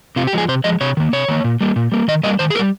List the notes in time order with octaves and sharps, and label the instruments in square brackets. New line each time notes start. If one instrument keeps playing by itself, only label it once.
[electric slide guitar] C3 F4
G4
F3 G#3 G#4
C3 C5
F3 G#3 D#5
C3 C#5
D#3 A#3
C3 C#5
D#3 A#3
A#2
G3 A#3
A#2
G3 A#3
D#3 D#5
G3 A#3 D#5
D#3 C5
G#4
A#3 A#4
G3